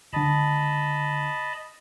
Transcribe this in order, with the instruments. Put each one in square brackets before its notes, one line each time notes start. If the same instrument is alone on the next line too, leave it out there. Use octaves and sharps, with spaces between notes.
[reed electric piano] C#2 D3 [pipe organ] D#5 A5 B5